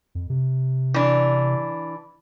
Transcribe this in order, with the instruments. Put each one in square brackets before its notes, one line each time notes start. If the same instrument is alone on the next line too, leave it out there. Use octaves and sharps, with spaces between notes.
[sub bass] F2
C3
[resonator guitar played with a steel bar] E3 D4